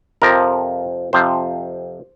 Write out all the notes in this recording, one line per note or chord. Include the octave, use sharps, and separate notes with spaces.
F2 C3 F3 A#4
F2 C3 F3 C5